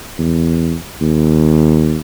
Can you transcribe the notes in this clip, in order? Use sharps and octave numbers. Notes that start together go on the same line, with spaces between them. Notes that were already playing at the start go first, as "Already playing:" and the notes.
E2
D#2